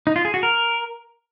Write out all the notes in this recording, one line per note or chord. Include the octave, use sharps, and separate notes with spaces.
D#4
F4
G#4
F#4
A#4